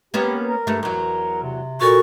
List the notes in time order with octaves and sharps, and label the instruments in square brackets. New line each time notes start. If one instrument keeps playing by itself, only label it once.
[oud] A#3 B3 C#4 [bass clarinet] G4
[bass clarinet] A#4
[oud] G2 A3
[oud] E2 F#3 [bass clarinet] A#4
[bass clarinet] C3
[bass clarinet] A#2 [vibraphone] F#4 A4 A#4 [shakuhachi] C#6